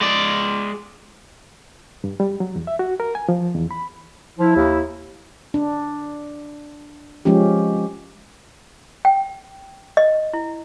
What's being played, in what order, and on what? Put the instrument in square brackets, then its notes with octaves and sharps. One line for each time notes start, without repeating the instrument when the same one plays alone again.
[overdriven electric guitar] G#3 D5
[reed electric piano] G2
G3
F#3
E2
E5
F#4
A#4
G#5
F3
E2
B5
[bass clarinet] F3 [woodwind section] E4
[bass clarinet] D#2
[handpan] D4
F3 G#3 C#4 G4
[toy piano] G5
D#5
E4